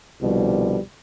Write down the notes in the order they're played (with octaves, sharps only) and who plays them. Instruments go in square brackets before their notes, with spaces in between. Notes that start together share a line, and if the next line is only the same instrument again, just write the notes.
[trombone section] C2 B2 D3 F3 G3